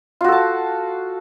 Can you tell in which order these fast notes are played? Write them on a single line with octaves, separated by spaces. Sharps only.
F4 F#4 A4 A5